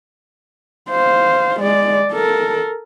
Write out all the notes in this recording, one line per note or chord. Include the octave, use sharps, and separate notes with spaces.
C5 F5
G#3 D5
A4 A#4